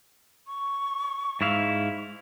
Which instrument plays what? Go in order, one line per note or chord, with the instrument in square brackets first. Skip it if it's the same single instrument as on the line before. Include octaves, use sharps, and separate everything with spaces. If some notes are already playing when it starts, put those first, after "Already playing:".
[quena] C#6
[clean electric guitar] G#2 E4 F5